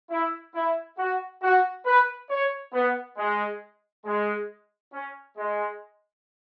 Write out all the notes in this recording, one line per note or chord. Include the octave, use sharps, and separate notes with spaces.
E4
E4
F#4
F#4
B4
C#5
B3
G#3
G#3
C#4
G#3